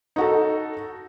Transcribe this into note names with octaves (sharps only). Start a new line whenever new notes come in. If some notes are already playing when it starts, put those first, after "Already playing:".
D#4 F#4 A4